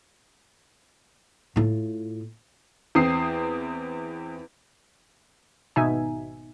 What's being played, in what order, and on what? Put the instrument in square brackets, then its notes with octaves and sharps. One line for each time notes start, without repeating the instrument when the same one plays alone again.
[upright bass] A2 F4
[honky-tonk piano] E2 C4 D#6 C7
[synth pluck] G#1 B2 D#4 E5 G#5